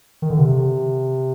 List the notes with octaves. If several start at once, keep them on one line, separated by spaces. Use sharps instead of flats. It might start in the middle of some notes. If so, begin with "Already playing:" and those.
D#3
D3
C3